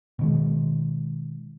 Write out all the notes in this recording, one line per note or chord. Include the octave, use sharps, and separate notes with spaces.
B2 D#3 G#3